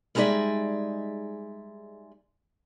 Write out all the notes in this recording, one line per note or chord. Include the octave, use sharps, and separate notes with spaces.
G3 G#3 D#4 G#4 D5 E5